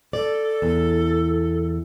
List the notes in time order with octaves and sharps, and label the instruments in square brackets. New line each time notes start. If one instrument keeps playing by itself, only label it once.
[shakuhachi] A4 [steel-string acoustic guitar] D5
[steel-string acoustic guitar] E2